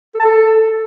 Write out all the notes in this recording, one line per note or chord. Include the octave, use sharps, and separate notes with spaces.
A4
A5
A4